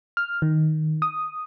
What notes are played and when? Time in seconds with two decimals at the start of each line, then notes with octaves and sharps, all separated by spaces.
0.17 F6
0.42 D#3
1.02 D#6